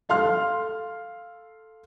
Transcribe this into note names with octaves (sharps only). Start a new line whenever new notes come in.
A4 F5 C6 F6